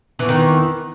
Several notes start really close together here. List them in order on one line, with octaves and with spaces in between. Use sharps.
E3 E2 D#3